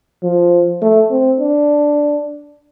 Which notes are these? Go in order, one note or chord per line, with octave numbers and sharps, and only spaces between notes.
F3
A3
C4
D4